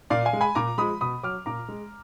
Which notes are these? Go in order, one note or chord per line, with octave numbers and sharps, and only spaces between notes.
A#2 D5 F5
F5 G#5
G#3
G#5 B5
A#2 A#5 D6
F3 G#3 B5 D#6
B2 B5 D#6
F#3 D6 F6
A#2 A#5 D6
G#3